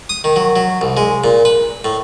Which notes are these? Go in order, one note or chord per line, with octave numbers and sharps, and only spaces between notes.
D#6
D#3
F#3
F#3
C2
G#3
A#2
B4
A2